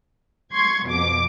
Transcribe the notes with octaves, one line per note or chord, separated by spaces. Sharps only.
C6 C#6 G#6
F2 B2 D6